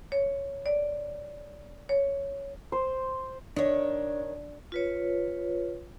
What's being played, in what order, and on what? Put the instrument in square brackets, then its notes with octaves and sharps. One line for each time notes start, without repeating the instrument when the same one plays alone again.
[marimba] C#5
D5
C#5
[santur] C5
[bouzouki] D#3 C#5 [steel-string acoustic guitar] D4
[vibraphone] F4 B4 C#5